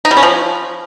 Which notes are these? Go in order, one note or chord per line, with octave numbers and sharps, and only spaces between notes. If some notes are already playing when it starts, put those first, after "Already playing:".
D#4
G3
C#4
F3